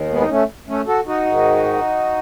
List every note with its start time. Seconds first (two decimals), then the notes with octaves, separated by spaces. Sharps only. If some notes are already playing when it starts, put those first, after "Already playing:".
Already playing: D#2 D#3
0.10 G#3 B3
0.21 D#4
0.29 A3 C#4
0.68 A3 C#4
0.87 F#4 A4
1.06 D#4 F#4
1.26 G#2 D#3